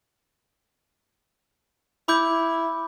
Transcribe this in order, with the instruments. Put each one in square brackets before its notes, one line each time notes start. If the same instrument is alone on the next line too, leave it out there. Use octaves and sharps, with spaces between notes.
[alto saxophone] E4 [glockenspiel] B5 D6 G6